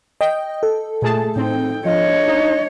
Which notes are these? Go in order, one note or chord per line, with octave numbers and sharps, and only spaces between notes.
D#5 G5
A4
A#2 A3 G#4 A5
A2 C4 D#4 G5
F3 D4 C#5 D#5
D#4